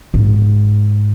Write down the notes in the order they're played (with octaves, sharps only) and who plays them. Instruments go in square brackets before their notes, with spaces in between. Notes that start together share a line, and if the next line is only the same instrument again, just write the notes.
[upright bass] G#2